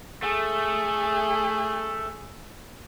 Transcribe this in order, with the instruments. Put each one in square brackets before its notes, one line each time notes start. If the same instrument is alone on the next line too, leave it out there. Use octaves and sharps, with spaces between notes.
[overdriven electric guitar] A3 [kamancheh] G#4